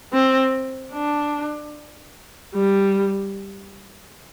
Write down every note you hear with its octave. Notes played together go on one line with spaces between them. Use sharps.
C4
D4
G3